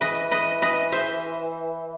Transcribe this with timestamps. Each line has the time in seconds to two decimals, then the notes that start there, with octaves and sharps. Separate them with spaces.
0.01 E3 B4 D#5
0.31 B4 D#5
0.62 B4 D#5
0.92 C5 E5